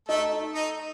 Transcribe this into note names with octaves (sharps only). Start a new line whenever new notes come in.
A3 D#4 A4
D#4 D#5